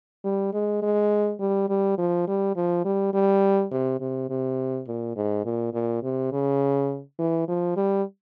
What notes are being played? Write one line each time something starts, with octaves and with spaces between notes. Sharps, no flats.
G3
G#3
G#3
G3
G3
F3
G3
F3
G3
G3
C3
C3
C3
A#2
G#2
A#2
A#2
C3
C#3
E3
F3
G3